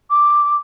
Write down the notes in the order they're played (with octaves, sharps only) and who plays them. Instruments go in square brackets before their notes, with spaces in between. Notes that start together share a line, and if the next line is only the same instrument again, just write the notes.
[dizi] D6